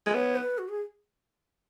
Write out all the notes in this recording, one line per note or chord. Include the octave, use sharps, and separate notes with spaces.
G#3
B3 C#5
B4
F#4
G#4